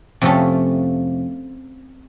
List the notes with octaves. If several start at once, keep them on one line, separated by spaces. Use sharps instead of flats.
F2 C3 F3 A3 C#4